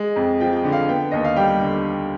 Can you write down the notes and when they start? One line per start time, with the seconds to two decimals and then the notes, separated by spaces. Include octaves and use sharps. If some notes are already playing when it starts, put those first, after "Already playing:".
Already playing: G#3
0.16 F2
0.40 F3 G5
0.56 G5
0.64 D3
0.72 F5
0.88 B3 G5
1.11 D#2 D#5
1.24 F5
1.36 G3 G5
1.61 D3